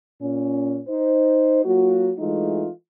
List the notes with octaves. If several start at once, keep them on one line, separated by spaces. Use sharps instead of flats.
A#2 C#4
D#4 C5
F#3 A#3 F4 F#4
E3 G#3 A3 D#4 F4